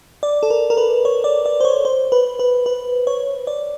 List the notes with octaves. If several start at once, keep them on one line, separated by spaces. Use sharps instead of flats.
D5
A4
A#4
A#4
B4
C#5
D5
D5
C5
C#5
C5
B4
B4
B4
C#5
D5